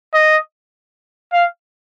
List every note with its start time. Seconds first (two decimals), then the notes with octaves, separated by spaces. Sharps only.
0.14 D#5
1.33 F5